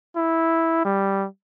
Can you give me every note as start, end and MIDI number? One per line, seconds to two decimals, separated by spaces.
0.16 0.84 64
0.85 1.26 55